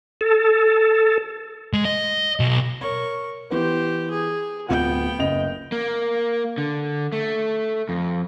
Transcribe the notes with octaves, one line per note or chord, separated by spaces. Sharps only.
A4
G#3
D#5
B1
A#4 C#5 C#6
E3 B3 G4 C5
G#4
D1 B3 F4 F#5 G5
F#1 D#5 F7
A#3
D3
A3
F2